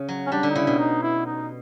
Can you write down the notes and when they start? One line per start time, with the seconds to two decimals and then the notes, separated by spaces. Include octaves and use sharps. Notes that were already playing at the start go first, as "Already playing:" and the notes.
Already playing: C#3
0.09 F#3
0.27 C#4
0.32 G3 D4
0.43 D3
0.50 D#4
0.55 C#3 E4
0.67 B2
0.79 D#4
1.02 E4
1.26 D#4